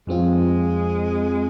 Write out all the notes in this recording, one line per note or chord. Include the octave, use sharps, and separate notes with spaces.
F2 F3 G#3 C4 F4